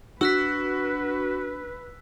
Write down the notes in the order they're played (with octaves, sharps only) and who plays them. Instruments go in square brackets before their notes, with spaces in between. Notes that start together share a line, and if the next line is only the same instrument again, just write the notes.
[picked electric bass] D4 [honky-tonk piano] F#4 [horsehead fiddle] B4 [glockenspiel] E6 F#6 B6